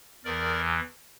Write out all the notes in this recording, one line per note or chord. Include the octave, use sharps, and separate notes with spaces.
E2 E3 A#4 D5